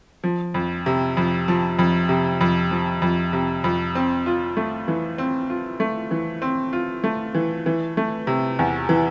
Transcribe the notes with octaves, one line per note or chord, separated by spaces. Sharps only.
F3
F2
C3
F2
F3
F2
C3
F2
F3
F2
C3
F2
C4
F4
A3
E3
C4
F4
A3
E3
C4
F4
A3
E3
E3
A3
C3
E2
E3